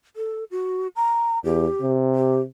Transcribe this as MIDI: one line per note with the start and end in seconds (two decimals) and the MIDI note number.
0.16 0.44 69
0.51 0.87 66
0.96 1.39 82
1.44 1.67 40
1.44 1.92 67
1.82 2.44 48
2.15 2.41 67